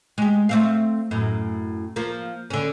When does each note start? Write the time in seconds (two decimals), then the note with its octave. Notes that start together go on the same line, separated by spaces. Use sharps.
0.18 G#3 G4
0.49 A3 C4 F5
1.11 F#2 A2
1.96 F3 A#3
2.50 D3 C#4